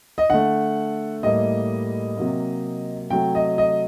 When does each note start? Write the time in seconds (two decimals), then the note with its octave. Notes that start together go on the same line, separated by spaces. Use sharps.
0.18 D#5
0.30 D3 A3 F#5
1.23 A2 G3 A#3 D#5
2.17 C3 F#3 A#3
3.10 C3 F#3 A3 G5
3.35 D#5
3.58 D#5